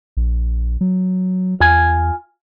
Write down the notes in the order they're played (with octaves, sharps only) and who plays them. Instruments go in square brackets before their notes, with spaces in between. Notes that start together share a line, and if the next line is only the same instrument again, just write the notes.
[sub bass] A#1
F#3
[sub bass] E2 [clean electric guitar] F4 G#5